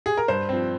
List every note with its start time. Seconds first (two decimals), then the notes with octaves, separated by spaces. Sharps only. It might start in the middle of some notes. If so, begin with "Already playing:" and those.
0.06 G#4
0.18 A#4
0.28 G2 C5
0.49 F3 C4